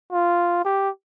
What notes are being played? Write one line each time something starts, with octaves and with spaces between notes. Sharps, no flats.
F4
G4